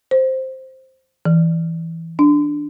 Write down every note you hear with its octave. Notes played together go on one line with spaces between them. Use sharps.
C5
E3
D4